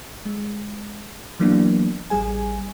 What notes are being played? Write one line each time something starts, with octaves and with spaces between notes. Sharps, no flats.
G#3
E3 F#3 A#3 B3 D4
A1 G3 G#4 G#5